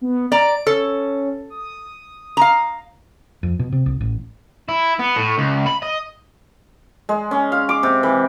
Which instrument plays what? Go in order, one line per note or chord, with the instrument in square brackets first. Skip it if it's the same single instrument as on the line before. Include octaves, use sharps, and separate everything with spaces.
[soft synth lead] B3
[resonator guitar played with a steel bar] D5 A#5 [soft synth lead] D7
[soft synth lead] C#4 [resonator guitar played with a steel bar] A4
[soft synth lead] D#6
[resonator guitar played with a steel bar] F5 A#5
[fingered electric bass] F2
B2
C3
C2
A1
[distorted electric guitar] E4
B3
A2
C#2
B5
D#5
[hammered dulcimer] G#3
C#4
F5
D6
C3
E3